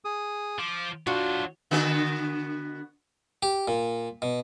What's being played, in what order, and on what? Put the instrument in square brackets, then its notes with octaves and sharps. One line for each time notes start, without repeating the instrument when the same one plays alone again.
[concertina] G#4 D#6
[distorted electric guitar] F3 [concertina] D6
[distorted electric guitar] F#3 C5 [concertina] D4 F4 [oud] F#4
[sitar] D3 B3 F#4
[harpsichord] G4
A#2
B2